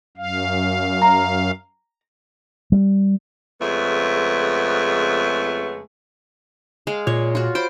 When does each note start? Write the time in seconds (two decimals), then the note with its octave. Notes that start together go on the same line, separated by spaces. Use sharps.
0.17 F#2 F5
1.02 A#5
2.72 G3
3.61 F2 C#3 G#3 A3 B3
6.87 G#3 F5
7.07 A#2 C#5
7.35 F4 F#4
7.55 C5 B5 C6 D7